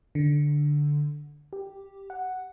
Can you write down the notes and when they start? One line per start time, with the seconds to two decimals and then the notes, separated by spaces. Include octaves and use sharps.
0.15 D3
1.53 G4
2.10 F#5